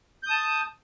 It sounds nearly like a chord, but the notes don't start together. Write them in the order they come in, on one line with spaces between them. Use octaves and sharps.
G6 D#6 A5